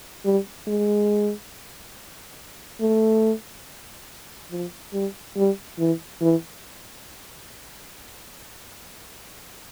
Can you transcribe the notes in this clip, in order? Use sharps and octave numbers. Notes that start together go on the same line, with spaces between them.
G3
G#3
A3
F3
G3
G3
E3
E3